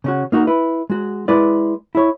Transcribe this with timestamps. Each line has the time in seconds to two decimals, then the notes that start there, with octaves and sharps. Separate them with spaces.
0.04 C#3 C#4 F#4
0.32 A#3 D#4 F#4 A#4
0.47 E4 B4
0.90 G#3 F#4
1.28 G#3 E4 B4 D5
1.95 E4 C#5